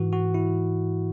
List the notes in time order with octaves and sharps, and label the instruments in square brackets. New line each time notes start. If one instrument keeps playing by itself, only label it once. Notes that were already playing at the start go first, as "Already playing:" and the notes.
Already playing: [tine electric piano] G#2 E3 F#4
F#4
E4